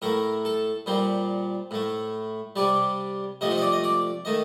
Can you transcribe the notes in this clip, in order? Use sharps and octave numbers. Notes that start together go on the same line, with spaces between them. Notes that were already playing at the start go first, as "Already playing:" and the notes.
A2 A3 A#4
A4
A#2 G3 C5
A2 A3
C3 G3 D5
C3 F3 A3 D#5
C5
D#5
D5
D#5
D5
D#3 A3 D#5